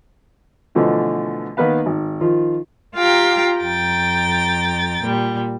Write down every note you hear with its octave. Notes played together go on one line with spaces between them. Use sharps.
B2 D3 E3 F3 A3 F4
D#3 A#3 B3 B4 F5
G#1
D#3 F3 F4
F4 G4 F5 G5 A#5
F2 G5 A#5 A6
A#2 G3